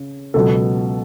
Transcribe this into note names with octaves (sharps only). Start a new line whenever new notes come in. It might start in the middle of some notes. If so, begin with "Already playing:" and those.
Already playing: C#3
C#2 B2 F#3 B3 A4